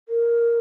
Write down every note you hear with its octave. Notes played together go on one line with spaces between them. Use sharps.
A#4